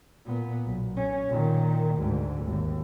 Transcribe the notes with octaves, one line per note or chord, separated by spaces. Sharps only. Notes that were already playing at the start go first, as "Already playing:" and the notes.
A#2 B3
B1
C#4
A#2 D#3
D2 G#2
G#1 D#2